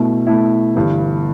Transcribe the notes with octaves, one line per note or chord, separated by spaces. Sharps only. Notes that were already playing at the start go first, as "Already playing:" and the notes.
Already playing: B2 A3 E4
B2 A3 E4
G1 G2 E3